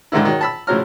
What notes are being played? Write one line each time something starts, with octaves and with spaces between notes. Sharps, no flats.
G#2 D3 D#3 E4
D#3 F#3
A5 B5 E6
A2 C#3 F3 F#3 A#5 F6